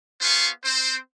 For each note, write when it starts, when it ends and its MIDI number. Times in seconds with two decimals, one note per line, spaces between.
0.21 0.49 59
0.21 0.49 65
0.21 0.49 68
0.21 0.49 72
0.21 0.49 77
0.21 0.49 85
0.65 0.97 60
0.65 0.97 72